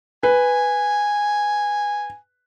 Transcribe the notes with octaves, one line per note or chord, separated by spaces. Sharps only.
B4 G#5